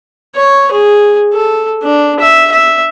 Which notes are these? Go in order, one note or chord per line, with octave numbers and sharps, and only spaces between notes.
C#5
G#4
A4
D4
E5
E5